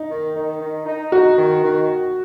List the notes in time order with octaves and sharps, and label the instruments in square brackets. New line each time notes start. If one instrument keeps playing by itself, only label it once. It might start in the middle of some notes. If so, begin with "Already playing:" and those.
Already playing: [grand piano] D#4
[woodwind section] D#3
D#3
D#3
D#4
[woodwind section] D#4 [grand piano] F#4
[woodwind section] D#3
D#3